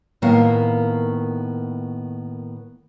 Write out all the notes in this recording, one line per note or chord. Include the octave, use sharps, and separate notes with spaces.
A2 D#3 A#3 B3 F5